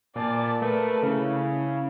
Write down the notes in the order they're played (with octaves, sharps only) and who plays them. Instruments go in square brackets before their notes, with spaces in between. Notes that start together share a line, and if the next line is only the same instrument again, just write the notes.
[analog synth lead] A#2 [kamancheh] D5 A5
[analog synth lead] A3 [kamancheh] A#4 B4
[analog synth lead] C#3 [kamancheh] E4